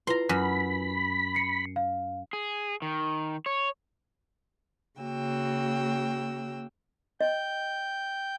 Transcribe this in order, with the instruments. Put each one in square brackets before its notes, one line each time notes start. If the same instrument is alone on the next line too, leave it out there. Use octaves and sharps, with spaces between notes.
[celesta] E4 F4 B4 [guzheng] A#5 C6
[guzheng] F#2 [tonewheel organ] B5
[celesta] C7 C#7
F5
[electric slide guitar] G#4
D#3
C#5
[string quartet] C#3 A#3 F#4 G5 E6
[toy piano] D#5 [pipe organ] G5 G6